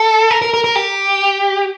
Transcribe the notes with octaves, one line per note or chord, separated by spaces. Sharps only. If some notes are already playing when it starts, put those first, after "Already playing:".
Already playing: A4
A#4
A#4
A#4
A#4
G4